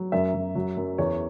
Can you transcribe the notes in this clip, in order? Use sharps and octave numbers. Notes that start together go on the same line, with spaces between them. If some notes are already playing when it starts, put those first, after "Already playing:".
Already playing: F#3
F#2 E5
F#2
F#3
F#2
E2 C#5